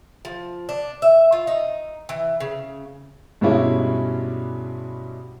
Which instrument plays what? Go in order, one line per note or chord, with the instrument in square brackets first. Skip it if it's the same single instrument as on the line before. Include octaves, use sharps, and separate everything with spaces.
[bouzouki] F3
D4
E5
F4
D#4
E3
C#3
[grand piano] G2 B2 G3 G#3 C#4 E4